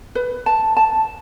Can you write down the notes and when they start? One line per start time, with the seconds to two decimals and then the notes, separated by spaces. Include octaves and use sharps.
0.15 B4
0.46 A5
0.77 A5